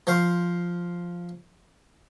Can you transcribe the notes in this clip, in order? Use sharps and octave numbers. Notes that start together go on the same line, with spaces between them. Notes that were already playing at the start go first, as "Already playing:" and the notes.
F3 C5 F5